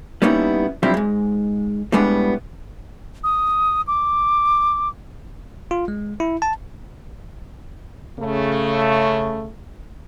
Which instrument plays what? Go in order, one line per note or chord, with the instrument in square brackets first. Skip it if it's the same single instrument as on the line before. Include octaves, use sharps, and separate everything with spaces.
[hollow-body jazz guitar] G3 A#3 B3 C#4 D#4 E4
F#2 F3 G3 C4 D4 E4
G#2 G#3
A2 G3 G#3 B3 D4
[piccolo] D#6
D6
[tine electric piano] F4
G#3
E4
A5
[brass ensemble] C#3 A3